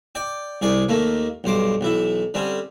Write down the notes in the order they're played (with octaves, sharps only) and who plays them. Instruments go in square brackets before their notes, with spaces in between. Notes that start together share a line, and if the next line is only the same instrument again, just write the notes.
[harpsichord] D5 G5
C2 G#4 D5
D#2 A3 A#3
B1 G2 C5 D6
B1 E3 E4
D3 G3 C4 C#4